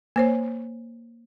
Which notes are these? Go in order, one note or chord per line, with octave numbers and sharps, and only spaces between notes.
A#3 C5 C#5